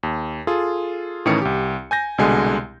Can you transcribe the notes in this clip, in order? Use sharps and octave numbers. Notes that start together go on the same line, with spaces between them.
D#2
F4 G#4 A4
A2 D#3 E3 C#4 C#7
C2 G4
G#5 G6 A#6
C2 B2 D3 G#3 G#5